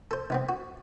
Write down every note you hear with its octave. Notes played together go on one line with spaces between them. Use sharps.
A4 C5
C2 B3 C4
F#4